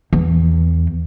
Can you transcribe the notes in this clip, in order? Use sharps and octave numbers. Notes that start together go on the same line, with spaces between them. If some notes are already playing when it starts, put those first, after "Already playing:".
E2